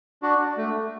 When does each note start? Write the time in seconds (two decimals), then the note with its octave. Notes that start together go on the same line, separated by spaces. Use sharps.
0.22 D4 F#4
0.57 A3